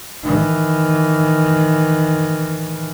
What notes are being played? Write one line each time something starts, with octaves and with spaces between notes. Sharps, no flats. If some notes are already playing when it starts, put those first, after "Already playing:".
D#3 E3